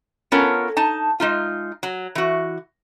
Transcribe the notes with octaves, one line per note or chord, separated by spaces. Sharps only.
B3 C#4 F4 A4 A#4 C#5
D#4 A5
G#3 D#4 F4
F#3
E3 F#4